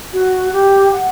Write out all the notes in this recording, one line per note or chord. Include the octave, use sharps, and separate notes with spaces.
F#4
G4
F#5